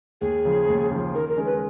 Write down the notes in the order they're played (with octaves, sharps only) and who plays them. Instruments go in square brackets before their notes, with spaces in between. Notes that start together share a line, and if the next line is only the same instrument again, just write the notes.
[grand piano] D#2 [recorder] G#4
[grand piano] C#3 F3
D#2
C#3 F3
[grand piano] D#3 [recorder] A#4
[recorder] A#4
[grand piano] G#3 C#4 G#4
[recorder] B4